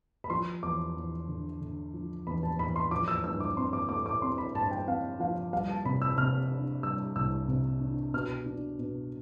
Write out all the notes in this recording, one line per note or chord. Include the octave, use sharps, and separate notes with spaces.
B5
F3 C6
E2 D6
E2
D3
D3
F3
E2 B5
A5
E2 B5
C6
F3 D6
E6
G2 E6
D6
C4 C6
D6
A3 D6
D6
C4 C6
B5
G2 A5
G5
C4 F5
F3 F5
G3 F5
A5
C3 B5
E6
C3 F6
D4
G3 E6
C2 E6
C3
D4
B2 F6
D4
B2